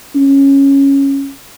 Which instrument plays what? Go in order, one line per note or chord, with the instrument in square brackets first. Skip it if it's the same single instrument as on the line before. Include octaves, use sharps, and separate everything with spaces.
[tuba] C#4